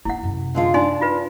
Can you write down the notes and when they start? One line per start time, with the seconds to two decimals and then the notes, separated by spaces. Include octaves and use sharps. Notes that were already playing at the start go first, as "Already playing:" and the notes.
0.05 A#3 D4 E4 F#5
0.23 F#2 C3
0.55 D3 G#3 F4
0.74 D4 D#4 G#5 C6
1.01 F4 B4